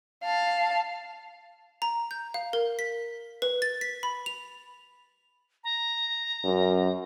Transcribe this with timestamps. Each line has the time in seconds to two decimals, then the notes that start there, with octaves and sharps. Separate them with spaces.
0.24 F5 A5
1.82 A#5
2.11 G6
2.34 F5
2.53 A#4
2.79 B6
3.42 B4
3.62 A6
3.81 B6
4.03 B5
4.26 F7
5.64 A#5
6.44 F#2